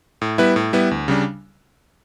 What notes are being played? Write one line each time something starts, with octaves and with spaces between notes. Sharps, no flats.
A2
G3 B3 E4 B4
A2
G3 B3 E4 B4
D2
C#3 G3 D4